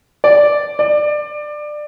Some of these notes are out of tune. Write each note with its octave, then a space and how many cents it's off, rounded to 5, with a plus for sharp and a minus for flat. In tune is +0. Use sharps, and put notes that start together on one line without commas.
D5 -5
D5 +20